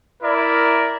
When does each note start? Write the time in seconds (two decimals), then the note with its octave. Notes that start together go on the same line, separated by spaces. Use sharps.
0.23 E4 A#4 D5